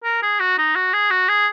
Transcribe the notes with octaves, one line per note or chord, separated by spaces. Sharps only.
A#4
G#4
F#4
D#4
F#4
G#4
F#4
G#4